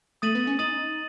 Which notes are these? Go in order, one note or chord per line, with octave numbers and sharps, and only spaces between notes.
A3 D#6 A6 D#7 F#7
B3
C#4
D#4 D#6 A6 D#7 F#7